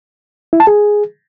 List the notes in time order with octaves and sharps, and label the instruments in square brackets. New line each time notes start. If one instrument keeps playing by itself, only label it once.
[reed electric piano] E4
A5
G#4